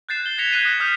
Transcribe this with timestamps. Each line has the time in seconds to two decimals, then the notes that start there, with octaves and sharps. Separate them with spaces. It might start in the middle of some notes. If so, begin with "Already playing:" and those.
0.09 F#6 G6 A6 C7 E7
0.22 A6 G7
0.38 G#6 A#6 B6 C#7 F7
0.52 F#6 G#6 A#6 B6 D#7 G7
0.65 D#6 F#6 G6
0.80 D#6 F6 G6 B6 F7